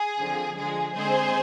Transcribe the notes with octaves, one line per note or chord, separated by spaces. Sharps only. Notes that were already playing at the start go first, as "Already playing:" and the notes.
Already playing: G#4
D3 F3 C4
D3 F3 G#3 G#4
D3 G#3 C4 G#4 C5